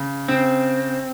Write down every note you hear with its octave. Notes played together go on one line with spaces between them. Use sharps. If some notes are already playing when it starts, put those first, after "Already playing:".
Already playing: C#3
C#3 C4